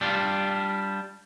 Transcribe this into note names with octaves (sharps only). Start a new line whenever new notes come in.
G3 D4 F4